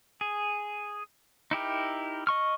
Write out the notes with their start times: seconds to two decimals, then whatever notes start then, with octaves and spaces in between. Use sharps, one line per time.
0.21 G#4
1.51 D#4 E4 G4 A#4
2.27 D#5 C#6 F6